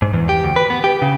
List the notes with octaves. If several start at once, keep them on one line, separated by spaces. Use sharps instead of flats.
G#2
E2
G4
D2
B4
B3
G4
C#3